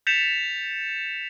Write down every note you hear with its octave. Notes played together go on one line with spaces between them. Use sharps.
G6 A6 B6 C#7 E7 F7